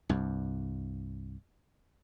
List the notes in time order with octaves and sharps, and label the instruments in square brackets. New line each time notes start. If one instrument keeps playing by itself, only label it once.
[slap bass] C2 G2